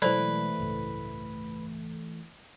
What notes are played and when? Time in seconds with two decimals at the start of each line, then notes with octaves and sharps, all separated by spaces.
0.02 B2 E3 F#3 G#3 A3 B4 C5 D5
0.58 G1 C#2 A2